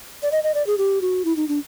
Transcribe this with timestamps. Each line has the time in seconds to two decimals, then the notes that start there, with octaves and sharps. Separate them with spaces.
0.23 D5
0.32 D#5
0.43 D#5
0.54 D5
0.67 G#4
0.78 G4
1.02 F#4
1.25 E4
1.36 D#4
1.48 D4